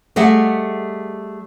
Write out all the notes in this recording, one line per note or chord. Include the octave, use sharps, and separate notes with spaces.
G3 A3 G#4 D#5 E5 F#5